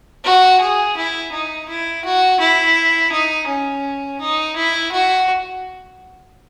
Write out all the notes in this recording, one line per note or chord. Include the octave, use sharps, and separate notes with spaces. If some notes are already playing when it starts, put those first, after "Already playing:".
F#4
G#4
E4
D#4
E4
F#4
E4
D#4
C#4
D#4
E4
F#4